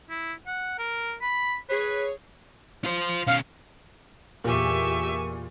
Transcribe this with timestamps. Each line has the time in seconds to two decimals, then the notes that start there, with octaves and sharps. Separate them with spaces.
0.10 E4
0.47 F#5
0.78 A#4
1.22 B5
1.69 G#4 B4 C#5
2.85 F4 C5
3.27 B2 C#4 F5
4.44 E2 A#2 G4 E5 G#5 C#6